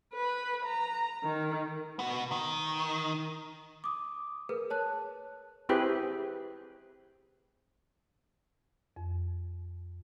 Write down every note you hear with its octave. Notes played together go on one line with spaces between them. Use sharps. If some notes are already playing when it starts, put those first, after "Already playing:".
B4
A#5
D#3
B3 F#4
D#3
D6 D#6
G#4 A#4 B4
C#5 A5 F#6
C4 E4 G4 G#4 B4
F2